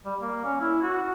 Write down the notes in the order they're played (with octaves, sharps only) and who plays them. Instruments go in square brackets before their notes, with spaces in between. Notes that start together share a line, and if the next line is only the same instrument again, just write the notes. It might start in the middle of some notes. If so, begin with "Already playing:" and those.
[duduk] G3
A#3
C#4
E4
F#4